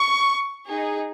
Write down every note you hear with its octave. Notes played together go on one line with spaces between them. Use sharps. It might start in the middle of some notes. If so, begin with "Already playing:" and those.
Already playing: C#6
D#4 G#4